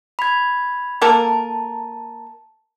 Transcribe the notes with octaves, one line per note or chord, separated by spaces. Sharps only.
B5 G#6
A#3 A4 A#4 A5